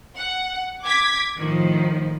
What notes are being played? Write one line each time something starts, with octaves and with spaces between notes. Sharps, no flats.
F#5
D6 G#6 B6
A2 D#3 F3